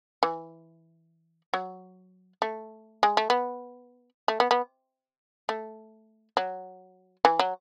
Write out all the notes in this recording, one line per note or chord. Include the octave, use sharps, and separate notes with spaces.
E3
F#3
A3
G#3
A3
B3
A3
B3
B3
A3
F#3
E3
F#3